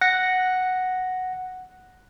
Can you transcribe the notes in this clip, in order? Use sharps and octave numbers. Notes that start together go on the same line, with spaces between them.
F#5 A#6